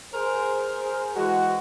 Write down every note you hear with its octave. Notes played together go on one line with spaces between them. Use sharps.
G#4 A#4 C5
E3 G#3 F#4